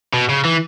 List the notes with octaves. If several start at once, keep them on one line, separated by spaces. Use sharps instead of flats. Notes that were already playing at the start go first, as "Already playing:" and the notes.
B2
C#3
E3